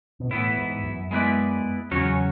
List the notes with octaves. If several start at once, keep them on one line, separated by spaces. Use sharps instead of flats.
B2
A2 E3 B3 E4
G#2
F#2
G#3 B3 E4 B4 D5
E2 C#3 F#3 C#4 F#4 C#5